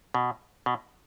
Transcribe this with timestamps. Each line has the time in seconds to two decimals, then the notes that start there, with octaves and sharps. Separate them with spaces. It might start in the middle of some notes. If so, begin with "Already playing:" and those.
0.14 B2
0.66 B2